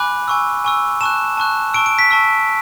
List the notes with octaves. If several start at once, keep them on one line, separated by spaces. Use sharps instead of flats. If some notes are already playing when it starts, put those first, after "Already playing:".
Already playing: G#5 B5 D6 F#6
G#5 C#6 E6
G#5 C#6 E6
A5 C#6 F#6 E7
A5 C#6 F#6
A5 C#6 E6 D7
D7
B6
A5 C#6 E6